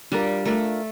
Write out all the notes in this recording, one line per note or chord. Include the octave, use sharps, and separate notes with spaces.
G3 D4 F4 A#4
A3 D4 F4 A#4